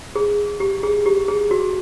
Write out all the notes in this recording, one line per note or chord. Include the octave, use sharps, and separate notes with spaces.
G#4
G4
G#4
G4
G#4
F#4